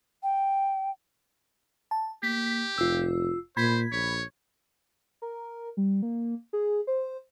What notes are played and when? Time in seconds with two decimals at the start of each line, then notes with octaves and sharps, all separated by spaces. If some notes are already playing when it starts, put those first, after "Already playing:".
0.23 G5
1.91 A5
2.23 A#3 G4 B6
2.78 F1 F4 E6
3.57 A#2 C5 B5 G#6 B6
3.92 A#1 C#5
5.22 A#4
5.77 G3
6.02 A#3
6.53 G#4
6.87 C5